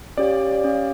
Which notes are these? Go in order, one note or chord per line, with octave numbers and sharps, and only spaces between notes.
C#4 G4 C#5 D5 F5
C#4 G4 C#5 F5